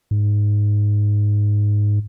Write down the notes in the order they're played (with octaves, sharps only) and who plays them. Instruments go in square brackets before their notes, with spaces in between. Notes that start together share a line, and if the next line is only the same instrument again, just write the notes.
[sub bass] G#2